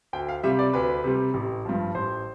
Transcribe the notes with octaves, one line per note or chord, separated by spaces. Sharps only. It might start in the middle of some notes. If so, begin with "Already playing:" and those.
D2 G5
F5
C3 G3 E5
D5
D2 B4
C3 G3
A1
G2 F3
A1 C5